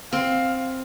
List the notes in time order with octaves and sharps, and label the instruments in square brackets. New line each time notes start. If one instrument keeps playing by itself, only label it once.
[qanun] C4 [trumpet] F5